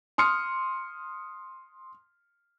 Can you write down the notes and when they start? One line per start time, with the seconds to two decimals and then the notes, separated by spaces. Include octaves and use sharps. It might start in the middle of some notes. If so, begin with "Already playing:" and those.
0.18 C6 D#6 F6 C#7